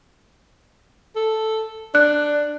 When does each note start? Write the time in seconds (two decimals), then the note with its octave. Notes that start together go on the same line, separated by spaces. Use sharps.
1.16 A4
1.95 D4 F#6